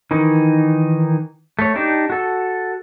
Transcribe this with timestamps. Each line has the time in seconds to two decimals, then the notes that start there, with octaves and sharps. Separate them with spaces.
0.11 D#3 E3 D#4
1.59 A3 C#5
1.76 D4 D#4 G4
2.10 F#4 A4